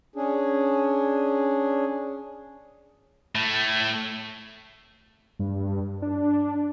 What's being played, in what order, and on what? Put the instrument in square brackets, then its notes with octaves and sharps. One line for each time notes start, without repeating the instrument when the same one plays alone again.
[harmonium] C#4 D4 G#4
[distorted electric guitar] A2 A3
[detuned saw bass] G2
D4